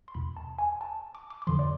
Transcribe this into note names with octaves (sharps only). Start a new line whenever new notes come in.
C6
E2 B2 B5
A5
G#5
A5
D6
D6
D6
F2 D3 F3 C6
D5